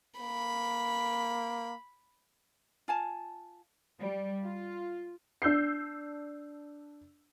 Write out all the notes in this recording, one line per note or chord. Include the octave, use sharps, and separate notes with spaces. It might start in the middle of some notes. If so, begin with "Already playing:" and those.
A#3 B5
F4 G#5 A5
G3
F4
D4 E6 G6 C7